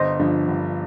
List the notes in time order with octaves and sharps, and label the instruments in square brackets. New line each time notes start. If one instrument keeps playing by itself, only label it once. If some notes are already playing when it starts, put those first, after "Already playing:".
Already playing: [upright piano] G1 [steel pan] C5 D#5
[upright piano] G2 D3 F3
G1